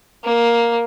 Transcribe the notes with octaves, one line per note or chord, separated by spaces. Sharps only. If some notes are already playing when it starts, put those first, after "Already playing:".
A#3